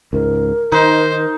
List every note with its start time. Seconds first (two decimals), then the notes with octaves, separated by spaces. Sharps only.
0.13 C#2 G#2 A#4
0.72 D#3 D#4 C5